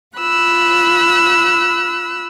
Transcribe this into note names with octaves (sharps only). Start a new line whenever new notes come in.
F4 B5 E6 F#6